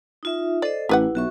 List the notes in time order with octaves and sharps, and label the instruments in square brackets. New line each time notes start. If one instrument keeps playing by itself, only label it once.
[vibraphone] D#4 F4 E5
[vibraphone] A4 C5 D#5 [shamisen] D5
[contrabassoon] A1 [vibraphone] E4 [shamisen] G4 B4 F#5
[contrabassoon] B1 [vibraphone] F#4 E5 C#6